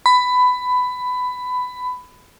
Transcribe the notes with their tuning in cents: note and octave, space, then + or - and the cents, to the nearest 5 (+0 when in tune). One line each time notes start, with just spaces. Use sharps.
B5 +15